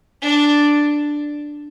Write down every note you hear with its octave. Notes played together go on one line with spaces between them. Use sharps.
D4